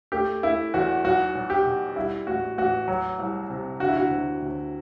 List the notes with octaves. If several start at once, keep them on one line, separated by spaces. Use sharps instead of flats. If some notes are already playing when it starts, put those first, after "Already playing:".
A3 G4
A3 E4
E2 F#4
B1 F#4
B1
G4
B2
G3 E4
A1 F#4
A1 F#4
F#3
C2
C3
D3 F#4
E4
F#4
D2
D2